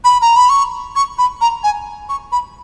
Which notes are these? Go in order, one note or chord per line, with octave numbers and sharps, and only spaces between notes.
B5
A#5
B5
C#6
C#6
B5
A#5
G#5
C#6
B5